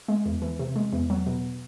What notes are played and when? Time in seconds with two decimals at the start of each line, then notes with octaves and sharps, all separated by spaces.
0.08 G#3
0.26 E2
0.42 E3
0.59 C3
0.76 G#3
0.93 E2
1.10 F#3
1.26 B2